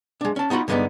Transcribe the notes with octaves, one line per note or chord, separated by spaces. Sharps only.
G#3 D4
C#4 A5
B3 D#4 F4 F#4 B5
G2 D3 G#3 A#3 B3 D#4